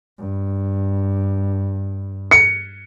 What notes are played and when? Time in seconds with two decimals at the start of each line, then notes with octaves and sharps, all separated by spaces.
0.18 G2
2.31 C#7